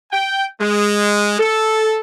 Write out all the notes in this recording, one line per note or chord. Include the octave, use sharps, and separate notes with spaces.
G5
G#3
A4